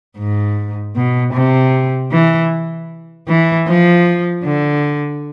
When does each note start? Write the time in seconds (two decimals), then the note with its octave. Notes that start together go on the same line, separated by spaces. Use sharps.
0.18 G#2
0.96 B2
1.34 C3
2.11 E3
3.28 E3
3.68 F3
4.44 D3